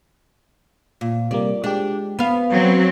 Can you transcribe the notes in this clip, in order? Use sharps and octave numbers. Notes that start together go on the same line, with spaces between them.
A#2
C3 G3 A#3 D5
G#3 D4 G4
B3 F5
F#3 C4 F#4 B4